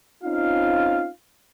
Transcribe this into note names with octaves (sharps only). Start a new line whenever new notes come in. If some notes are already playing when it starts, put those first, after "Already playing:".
C4 C#4 D#4 F4 F5